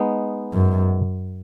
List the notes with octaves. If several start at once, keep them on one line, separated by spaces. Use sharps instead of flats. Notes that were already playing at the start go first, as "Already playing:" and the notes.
Already playing: G#3 B3 D#4
F#2